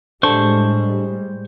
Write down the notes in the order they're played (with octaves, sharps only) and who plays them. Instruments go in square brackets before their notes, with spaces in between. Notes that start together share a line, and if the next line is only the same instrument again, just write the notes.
[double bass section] A2 G3 G#3 [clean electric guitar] D4 A4 [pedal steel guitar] C5 C#6